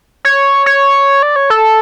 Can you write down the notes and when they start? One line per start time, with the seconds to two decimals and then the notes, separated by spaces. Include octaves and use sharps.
0.25 C#5
0.66 C#5
1.23 D5
1.36 C#5
1.50 A4